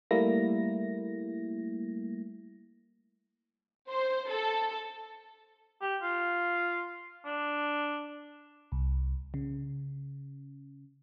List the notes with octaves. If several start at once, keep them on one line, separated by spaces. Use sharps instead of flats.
G3 A3 A#3 E4 A#6
C5
A4
G4
F4
D4
C2
C#3